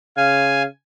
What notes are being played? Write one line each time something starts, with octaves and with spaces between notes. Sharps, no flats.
C#3 F5 G#5